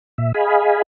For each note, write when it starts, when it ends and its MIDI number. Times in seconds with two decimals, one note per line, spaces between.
0.18 0.32 46
0.18 0.32 76
0.34 0.82 68
0.34 0.82 75
0.34 0.82 77
0.34 0.82 80
0.34 0.82 83